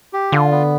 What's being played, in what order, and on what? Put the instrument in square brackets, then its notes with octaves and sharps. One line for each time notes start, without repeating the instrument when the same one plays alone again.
[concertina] G4
[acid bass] D3 [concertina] F4
[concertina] B3